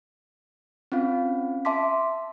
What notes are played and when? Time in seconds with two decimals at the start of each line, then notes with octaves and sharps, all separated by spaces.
0.92 C4 C#4 F4 F5
1.65 E5 A5 C6 D6 B6